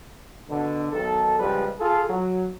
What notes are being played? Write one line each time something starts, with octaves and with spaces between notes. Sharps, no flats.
B2 D3
B1 D#3 A4
C#2 F3 G3 B4
F4 G#4 A4
F#3